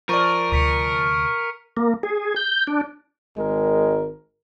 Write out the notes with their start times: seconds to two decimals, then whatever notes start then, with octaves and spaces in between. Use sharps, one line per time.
0.09 F3 A#4 D5 C#6 D#7
0.52 D2 C3 C#6 B6 C#7
1.77 A#3
2.03 G#4
2.36 G6
2.67 D4
3.38 G#1 G#3 A#4